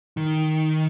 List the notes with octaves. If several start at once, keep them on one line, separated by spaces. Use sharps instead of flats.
D#3